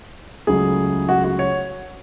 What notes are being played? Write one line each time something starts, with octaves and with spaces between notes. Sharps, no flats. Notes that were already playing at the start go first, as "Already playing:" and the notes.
C#2 C#3 F#3 A3 G#4
F#4
F#4
C#5